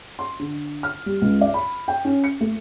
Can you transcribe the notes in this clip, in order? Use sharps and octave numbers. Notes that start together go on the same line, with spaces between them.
C6
D3
F6
G3
C#2
D5
B5
G5
C#4
C#7
A3